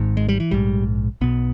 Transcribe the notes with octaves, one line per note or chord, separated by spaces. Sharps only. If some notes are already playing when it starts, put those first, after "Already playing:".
Already playing: G#1 G#2
G#3
G3
E3
A#1 G#2 G3
B1 B2 B3